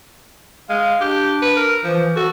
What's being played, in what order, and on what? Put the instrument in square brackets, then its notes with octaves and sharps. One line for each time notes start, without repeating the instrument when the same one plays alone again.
[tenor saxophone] G#3 [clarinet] F5
[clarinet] D4 [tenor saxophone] G4
[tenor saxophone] B4
A#4
[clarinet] E3 [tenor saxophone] F3
[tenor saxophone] F#4 [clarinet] A4